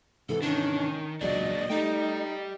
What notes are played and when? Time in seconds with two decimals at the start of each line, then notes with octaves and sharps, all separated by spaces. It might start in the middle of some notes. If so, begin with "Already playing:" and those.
0.29 G#2 C3 E3 A4
0.42 D#3 C#4 D4
1.21 E1 C#2 A#2 F#3 G#3 D4 D5 D#5
1.70 A3 D#4 G4 D5 G5